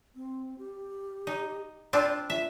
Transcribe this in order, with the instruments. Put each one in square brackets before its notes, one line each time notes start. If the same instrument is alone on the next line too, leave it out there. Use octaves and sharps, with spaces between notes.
[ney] C4
G4
[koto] D#4
[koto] C4 D4 F4 [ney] G5
[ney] F4 [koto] E5